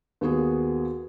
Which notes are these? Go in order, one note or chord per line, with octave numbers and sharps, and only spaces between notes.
D#2 B3 F#4 G#4